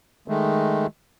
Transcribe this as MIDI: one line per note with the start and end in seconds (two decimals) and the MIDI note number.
0.28 0.86 51
0.28 0.86 56
0.28 0.86 57